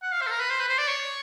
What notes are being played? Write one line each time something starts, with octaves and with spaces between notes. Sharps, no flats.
F#5
F5
C5
A4
A#4
B4
C5
B4
C5
D5
C#5